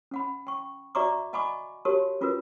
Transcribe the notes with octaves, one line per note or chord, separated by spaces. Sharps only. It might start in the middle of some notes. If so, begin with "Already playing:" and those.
C#4 F#5 B5
G5 C#6
F#4 D5 E5 A#5 C#6 D6
D#5 F#5 G#5 B5 C#6 D6
F#4 G4 A#4 C#5 A5
C#4 F4 F#4 A#4 B4